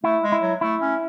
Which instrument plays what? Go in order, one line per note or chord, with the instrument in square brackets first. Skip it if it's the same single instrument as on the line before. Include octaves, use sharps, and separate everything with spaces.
[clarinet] A3 [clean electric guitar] E4
[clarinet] G#3
[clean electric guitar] E4
[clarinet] F#3
[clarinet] A3 [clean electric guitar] E4
[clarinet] C#4